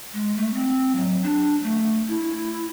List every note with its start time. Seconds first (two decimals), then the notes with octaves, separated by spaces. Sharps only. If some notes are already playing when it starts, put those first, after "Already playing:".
0.14 G#3
0.36 A3
0.54 C4
0.96 F#3
1.23 D4
1.63 A3
2.08 E4